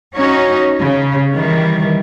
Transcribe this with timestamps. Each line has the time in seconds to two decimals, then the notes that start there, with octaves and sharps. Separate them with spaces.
0.16 C#4 D#4 F#4 C#5
0.81 C#3
1.34 D#3 E3 G3